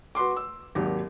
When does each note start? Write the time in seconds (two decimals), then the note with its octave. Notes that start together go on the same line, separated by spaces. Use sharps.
0.15 F#4 B4 C6 D6
0.37 E6
0.75 G#1 D#2 F#3 G4